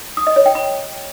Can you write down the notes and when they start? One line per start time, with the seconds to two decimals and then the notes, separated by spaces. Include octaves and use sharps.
0.17 D#6
0.27 D#5
0.36 C#5
0.46 G5
0.55 B5